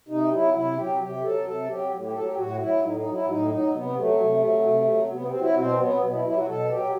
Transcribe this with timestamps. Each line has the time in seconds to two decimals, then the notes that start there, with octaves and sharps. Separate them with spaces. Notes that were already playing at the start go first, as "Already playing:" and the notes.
0.08 C3 D#4
0.31 F#3 E4
0.54 C3 E4
0.76 F#3 G4
1.00 C3 G4
1.22 F#3 A4
1.45 C3 A4
1.68 F#3 G4
1.91 A2
2.02 G4
2.14 F#3 A4
2.25 G4
2.36 A2 F#4
2.60 F#3 E4
2.82 A2 D#4
2.97 D#4
3.05 F#3
3.12 E4
3.27 A2 D#4
3.50 F#3 D#4
3.74 C3 B3
3.96 F#3 A3
4.20 C3
4.42 F#3
4.64 C3
4.87 F#3
5.10 C3 B3
5.26 C4
5.33 F#3
5.41 E4
5.55 B2 C4
5.78 F#3 B3
6.01 B2 B3
6.12 E4
6.24 F#3 E4
6.30 G4
6.36 F#4
6.47 B2 A4
6.69 F#3 G4